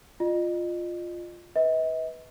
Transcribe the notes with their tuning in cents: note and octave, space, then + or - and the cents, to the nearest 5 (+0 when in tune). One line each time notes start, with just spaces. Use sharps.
F4 +0 D#5 -35
B4 +0 D#5 +45